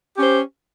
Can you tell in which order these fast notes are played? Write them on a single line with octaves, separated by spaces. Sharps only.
G4 C#4 C5